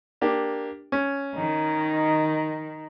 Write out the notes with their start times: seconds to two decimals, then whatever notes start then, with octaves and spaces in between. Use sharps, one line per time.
0.21 A#3 D4 G4
0.92 C#4
1.37 D#3